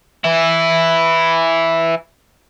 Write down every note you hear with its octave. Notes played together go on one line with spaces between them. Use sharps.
E3 E4